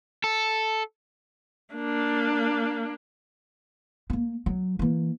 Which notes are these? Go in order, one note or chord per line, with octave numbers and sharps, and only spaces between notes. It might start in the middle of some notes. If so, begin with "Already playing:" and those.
A4
A#3 D4
A#3 B3
F#3
E3 A#3